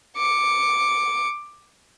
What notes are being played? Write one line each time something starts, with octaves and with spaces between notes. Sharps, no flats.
D6 C#7